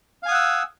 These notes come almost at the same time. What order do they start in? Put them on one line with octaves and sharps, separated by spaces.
F5 G#5 D#6 F#5 E6